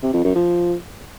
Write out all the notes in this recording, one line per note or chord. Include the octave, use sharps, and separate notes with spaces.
C3
F2
F#2
F3